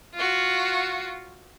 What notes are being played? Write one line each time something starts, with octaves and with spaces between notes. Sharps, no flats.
F4 F#4